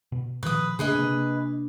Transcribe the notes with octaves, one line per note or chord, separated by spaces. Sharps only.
B2
A#2 D#3 F3 B4 D#6
C#3 A3 A#3 D4 G#4 B4 D#5
C3 A#3